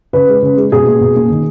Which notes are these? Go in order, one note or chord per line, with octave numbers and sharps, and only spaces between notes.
C#3 B4
G#3
C#3
G#3
B2 G#4
A#3
B2
A#3
D#3